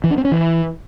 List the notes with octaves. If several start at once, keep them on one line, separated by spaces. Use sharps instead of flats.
E3
D4
C4
C#4
E3